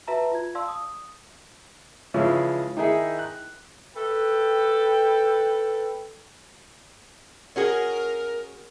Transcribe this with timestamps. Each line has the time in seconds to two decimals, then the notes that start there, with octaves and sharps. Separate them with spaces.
0.07 F#4 B4 E5 A5 A#5
0.32 F4 G#6
0.55 D5 F5 A5 C6 E6
0.68 D#6
2.14 C#3 E3 F3 G#3 C#4 E4
2.77 D#3 D#4 E4 G#4 E5
3.19 F#6
3.95 A4 B4 G5
7.56 C#4 F#4 G#4 A#4